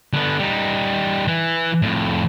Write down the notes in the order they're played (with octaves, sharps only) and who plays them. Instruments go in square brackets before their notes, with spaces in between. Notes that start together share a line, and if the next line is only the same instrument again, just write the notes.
[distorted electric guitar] D3 B3
G3 D#4
E3
F2 A2